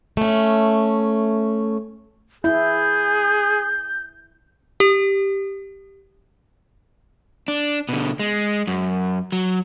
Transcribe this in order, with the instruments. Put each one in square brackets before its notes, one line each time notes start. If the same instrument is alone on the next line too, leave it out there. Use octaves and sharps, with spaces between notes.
[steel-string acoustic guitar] A3 C#4
[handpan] E4 [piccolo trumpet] G#4 [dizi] G6
[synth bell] G4
[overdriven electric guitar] D4
B2 D3
G#3
F#2
F#3